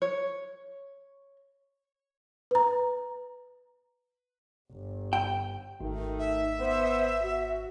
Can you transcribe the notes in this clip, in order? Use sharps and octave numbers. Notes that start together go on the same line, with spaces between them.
C#5
B4 A#5
G1
G5
G#1 D#3 A3 D#4
E5
B3 C5
F#4